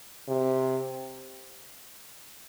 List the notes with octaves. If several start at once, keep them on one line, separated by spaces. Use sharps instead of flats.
C3